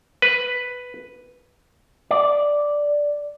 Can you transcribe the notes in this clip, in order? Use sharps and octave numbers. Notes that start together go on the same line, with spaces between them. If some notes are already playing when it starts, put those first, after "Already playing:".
B4
D5